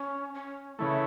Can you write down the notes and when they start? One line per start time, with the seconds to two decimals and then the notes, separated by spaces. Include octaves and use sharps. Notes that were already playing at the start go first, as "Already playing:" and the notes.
Already playing: C#4
0.34 C#4
0.78 C#3 E3 A3 E4